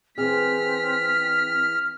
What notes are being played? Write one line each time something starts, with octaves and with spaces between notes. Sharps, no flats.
E3 C4 G#4 F6 B6